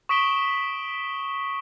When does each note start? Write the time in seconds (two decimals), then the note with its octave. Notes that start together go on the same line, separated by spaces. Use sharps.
0.09 C#6 D#6 B6 D7 E7 G7